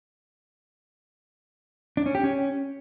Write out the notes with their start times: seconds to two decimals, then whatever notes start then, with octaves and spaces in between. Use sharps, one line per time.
1.97 D4
2.06 C#4
2.15 G4
2.23 C#4